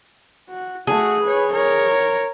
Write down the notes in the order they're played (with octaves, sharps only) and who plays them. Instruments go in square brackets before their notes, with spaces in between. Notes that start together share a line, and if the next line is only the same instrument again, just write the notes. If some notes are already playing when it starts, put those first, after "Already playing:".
[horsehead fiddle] F#4
[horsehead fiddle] A3 F#4 [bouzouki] G#4
[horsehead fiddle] B4 C#5
A#4 C#5